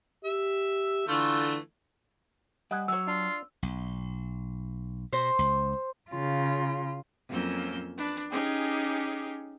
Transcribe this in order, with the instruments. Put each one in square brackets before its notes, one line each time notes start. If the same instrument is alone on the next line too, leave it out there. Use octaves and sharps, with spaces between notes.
[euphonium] G4 [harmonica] E5
[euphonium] D3 [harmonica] E3 A3 F4
[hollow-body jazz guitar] G3 [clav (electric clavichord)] D#5 F#5 G#5
[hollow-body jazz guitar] F#3 C#5 [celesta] E6
[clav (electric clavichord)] D4 [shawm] F4
[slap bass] B1
[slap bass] B2 [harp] C5
[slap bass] C#2
[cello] C#3 F4
[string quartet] F2 F#3 A#3 C#4 E6 G6
D4 B4
C#4 D#4 G4 G#4